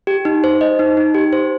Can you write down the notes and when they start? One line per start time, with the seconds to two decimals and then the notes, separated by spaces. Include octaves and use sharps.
0.07 G4
0.25 D#4
0.44 C5
0.61 D#5
0.79 D#4
0.97 D#4
1.14 G4
1.33 C5